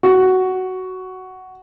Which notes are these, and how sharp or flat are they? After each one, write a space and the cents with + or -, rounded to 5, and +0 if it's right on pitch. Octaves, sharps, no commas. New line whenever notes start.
F#4 +10